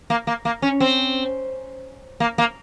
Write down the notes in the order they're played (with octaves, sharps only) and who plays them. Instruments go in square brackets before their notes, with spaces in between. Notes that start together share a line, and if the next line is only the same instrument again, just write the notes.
[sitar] A#3
A#3
A#3
C#4
C4
A#3
A#3